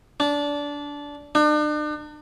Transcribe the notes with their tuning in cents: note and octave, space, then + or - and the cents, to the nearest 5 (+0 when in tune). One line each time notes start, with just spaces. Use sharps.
D4 -20
D4 +40